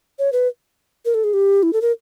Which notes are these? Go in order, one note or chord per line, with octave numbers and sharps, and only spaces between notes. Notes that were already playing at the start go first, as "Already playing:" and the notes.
C#5
B4
A#4
A4
G#4
G4
E4
A4
A#4